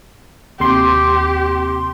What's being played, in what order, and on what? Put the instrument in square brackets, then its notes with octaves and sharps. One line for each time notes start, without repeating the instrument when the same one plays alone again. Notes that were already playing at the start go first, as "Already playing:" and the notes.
[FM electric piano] D#2 C3 C6 [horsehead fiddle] G4